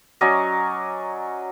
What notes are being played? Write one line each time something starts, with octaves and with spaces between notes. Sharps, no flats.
F#3 C#4 D5 D#5